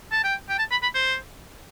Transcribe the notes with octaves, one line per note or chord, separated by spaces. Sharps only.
A5
G5
G5
A5
B5
B5
C5